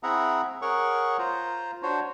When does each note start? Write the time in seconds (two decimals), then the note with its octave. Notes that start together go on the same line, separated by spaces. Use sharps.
0.03 C4 E4 G#4 E5 F#5 A#5
0.62 G#4 A#4 C#5 F#5 C#6
1.19 F4 C5 A#5
1.82 D4 F#4 C5 C#5